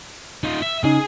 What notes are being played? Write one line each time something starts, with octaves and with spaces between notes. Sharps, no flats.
D#4 F4
E5
C#3 D#4 G#4